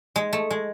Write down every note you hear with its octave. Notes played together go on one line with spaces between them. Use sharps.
G#3
A3
G#3